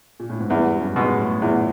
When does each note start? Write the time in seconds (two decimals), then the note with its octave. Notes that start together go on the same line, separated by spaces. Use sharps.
0.19 A#2
0.29 A2
0.40 G#2
0.50 E2 G2
0.76 G2
0.80 F#2
0.96 B2 G#3
1.11 A2
1.42 E2 A#2